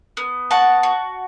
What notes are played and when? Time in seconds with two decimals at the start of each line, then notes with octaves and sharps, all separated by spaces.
0.17 B3
0.51 F#4 F#5 A5
0.83 F#4